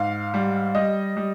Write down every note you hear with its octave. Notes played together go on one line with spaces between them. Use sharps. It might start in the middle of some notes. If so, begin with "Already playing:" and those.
Already playing: G#2 F5
G3
G3 D#5
G3